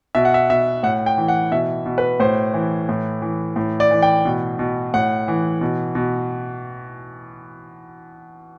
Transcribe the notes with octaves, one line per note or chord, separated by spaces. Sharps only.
B2 E5
F#5
E5
B2 E5
A2 F#5
G5
E3
F#5
B2 E5
B2
B4
A2 C5
E3
A2
E3
A2
D5
E3
G5
B2
B2
A2 F#5
E3
B2
B2